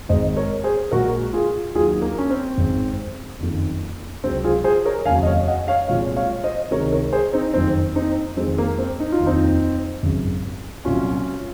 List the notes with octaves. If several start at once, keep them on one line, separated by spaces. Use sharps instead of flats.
G#1 G#2 D#3 G#3 C5 D#5
A#4 C#5
G#4 C5
A#1 A#2 G#3 F#4 A#4
F4 G#4
D#2 D#3 F#3 F4 G#4
A#3
C#4
C4
G#1 G#2 D#3
F#1 F2 D#3
C#2 C3 F#3 C4
F4 G#4
G#4 C5
A#4 C#5
F1 D#2 C#3 F#3 F5 G#5
D#5
C#5 F5
D#5 F#5
C#5 F5
C2 A#2 F3 G#3 C#5 F5
C#5 F5
C5 D#5
C#2 C3 D#3 G#3 A#4 C#5
A#4 C#5
G#4 C5
C4 D#4
F#1 F2 D#3 C4 D#4
C4 D#4
F2 D#3 G#3 C4
A#3
C4
D#4
F4
F1 D#2 D#3
C4 D#4
G#1 F#2 C#3
C2 A#2 F#3 C#4 F4